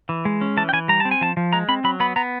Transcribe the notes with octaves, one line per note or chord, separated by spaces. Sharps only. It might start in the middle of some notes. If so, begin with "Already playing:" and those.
E3
G#3
C#4
E3 A5
G5
E3 G#5
G3 A#5
C4 A5
G#5
F3 A5
F3
G#3 A#5
C4 B5
F#3 B5
B3 B5
B3 A#5